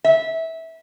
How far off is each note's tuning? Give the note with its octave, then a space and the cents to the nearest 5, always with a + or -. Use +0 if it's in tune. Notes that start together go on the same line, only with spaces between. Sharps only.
E5 -20